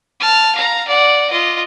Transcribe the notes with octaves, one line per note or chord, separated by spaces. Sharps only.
A5 F6
F5 A#5
D5 F#5
F4 D#5